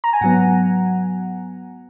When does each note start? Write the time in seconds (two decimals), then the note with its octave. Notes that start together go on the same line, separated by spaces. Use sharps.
0.04 A#5
0.13 G#5
0.21 G#2 F#3 B3 F#5